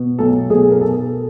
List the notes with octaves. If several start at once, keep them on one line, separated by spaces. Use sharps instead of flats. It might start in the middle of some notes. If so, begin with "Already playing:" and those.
Already playing: B2
B1 A4
B1 G#4
A#4
B2 A4